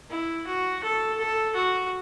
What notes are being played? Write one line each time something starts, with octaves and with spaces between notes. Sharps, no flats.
E4
F#4
A4
A4
F#4